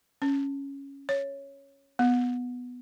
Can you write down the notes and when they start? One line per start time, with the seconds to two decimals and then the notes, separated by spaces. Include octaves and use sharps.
0.22 C#4
1.09 C#5
1.99 B3